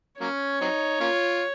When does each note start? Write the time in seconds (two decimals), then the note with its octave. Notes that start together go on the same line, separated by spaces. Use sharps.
0.20 F#3 A#3 C#4 C#5
0.61 F#3 C4 D#4
1.00 A#3 C#4 F4